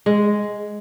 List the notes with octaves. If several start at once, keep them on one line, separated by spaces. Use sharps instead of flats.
G#3